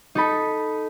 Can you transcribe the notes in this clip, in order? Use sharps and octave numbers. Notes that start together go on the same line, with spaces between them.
D#4 A4 B5